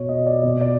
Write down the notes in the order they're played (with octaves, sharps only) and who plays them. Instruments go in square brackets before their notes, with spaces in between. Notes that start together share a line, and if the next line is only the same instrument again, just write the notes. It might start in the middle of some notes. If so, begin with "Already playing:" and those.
Already playing: [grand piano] B2 C#5
D#5
D5
B2 D5
D5